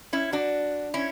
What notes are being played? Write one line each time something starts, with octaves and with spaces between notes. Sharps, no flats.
C#4 E4
D4 F#4
C#4 E4